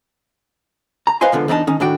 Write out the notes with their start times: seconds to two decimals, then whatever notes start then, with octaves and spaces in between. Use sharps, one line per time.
1.07 A#5
1.21 B4 C5 D#5 F5 G#5 C6
1.32 C#2 D3 F3 B3
1.48 E2 D4 D#4 A4 A5
1.67 D#3 C#4 D#4
1.80 A2 D#3 D4 F#4 G5